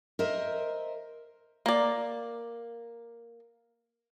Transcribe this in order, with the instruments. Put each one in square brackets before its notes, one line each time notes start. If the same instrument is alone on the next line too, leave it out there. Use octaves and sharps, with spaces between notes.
[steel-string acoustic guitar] A#4 C5 D#5 E5
[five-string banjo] A#3 D5